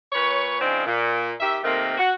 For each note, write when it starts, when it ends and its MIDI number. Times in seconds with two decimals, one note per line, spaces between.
0.13 0.58 46
0.13 0.58 71
0.13 0.58 73
0.61 0.84 49
0.61 0.84 53
0.61 0.84 60
0.61 0.84 62
0.61 0.84 63
0.86 1.32 46
1.40 1.58 51
1.40 1.58 67
1.40 1.58 76
1.64 1.95 48
1.64 1.95 51
1.64 1.95 57
1.64 1.95 58
1.64 1.95 60
1.98 2.11 66